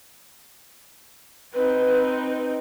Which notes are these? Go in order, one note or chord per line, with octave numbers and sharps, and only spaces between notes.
C4 D#4 B4